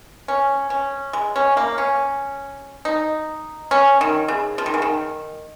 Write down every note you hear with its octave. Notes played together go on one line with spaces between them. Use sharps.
C#4
C#4
G#3
C#4
A#3
C#4
D#4
C#4
D#3
C#3
F3
D#3
C#3
D#3